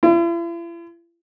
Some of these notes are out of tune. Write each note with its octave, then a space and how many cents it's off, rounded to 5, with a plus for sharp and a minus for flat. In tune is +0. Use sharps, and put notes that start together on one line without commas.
E4 +45